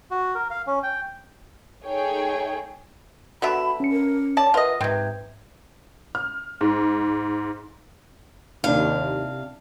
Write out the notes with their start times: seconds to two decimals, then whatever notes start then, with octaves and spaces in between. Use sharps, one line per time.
0.11 F#4
0.35 A#4
0.51 F5
0.67 C#4
0.83 G5
1.84 A3 D#4 G#4 C#5 G5
3.42 D3 B3 F#4 E5 B5
3.80 C#4 C#7
3.92 A#4
4.37 C#5 D5 A5
4.54 F4 A#4 B4 D#5 E5 F#5
4.81 G#2 C3 C4 B4 G6 G#6
6.15 F6
6.61 G#2
8.64 D#2 C3 D4 E4 F5